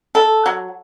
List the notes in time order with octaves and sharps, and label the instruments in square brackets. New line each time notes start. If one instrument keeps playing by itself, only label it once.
[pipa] A4
F#3